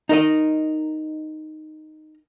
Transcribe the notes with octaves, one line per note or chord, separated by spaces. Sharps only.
D#4 A#4 D#5